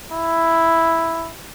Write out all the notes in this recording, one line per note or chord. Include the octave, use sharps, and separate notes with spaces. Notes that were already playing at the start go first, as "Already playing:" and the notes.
E4